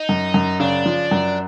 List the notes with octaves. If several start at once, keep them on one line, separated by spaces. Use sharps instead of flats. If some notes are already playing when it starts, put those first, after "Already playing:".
Already playing: D#4
F#2
F#2
C#3 D4
F3
F#2